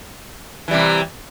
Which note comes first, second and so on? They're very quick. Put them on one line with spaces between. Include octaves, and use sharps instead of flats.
E3 G3 C3